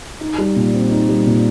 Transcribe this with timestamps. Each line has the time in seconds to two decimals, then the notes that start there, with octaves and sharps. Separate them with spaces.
0.21 D#4
0.38 G3
0.56 A#2
0.74 C4
0.91 D#4
1.09 G3
1.26 A#2